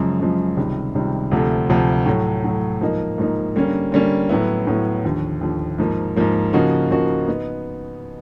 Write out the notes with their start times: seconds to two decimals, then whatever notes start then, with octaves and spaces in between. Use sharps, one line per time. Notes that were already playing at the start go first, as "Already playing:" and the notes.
Already playing: F#2 C#3 F3 G#3
0.20 F#2 C#3 F3 G#3
0.57 C#2 C3 D#3 G3
0.95 C#2 C3 D#3 G3
1.31 D2 C3 F3 A3
1.70 D2 C3 F3 A3
2.06 A2 F#3 A3
2.44 A2 F#3 A3
2.81 G#2 F3 A#3 D#4
3.18 G#2 F3 A#3 D#4
3.56 D3 G3 A#3 C#4
3.92 D3 G3 A#3 C#4
4.29 A2 F#3 B3 E4
4.67 A2 F#3 B3 E4
5.04 D#2 D3 F3
5.41 D#2 D3 F3
5.78 G#2 F3 A#3
6.16 G#2 F3 A#3
6.53 C#3 F3 A#3 D#4 F#4
6.90 C#3 F3 A#3 D#4 F#4
7.27 B3 D#4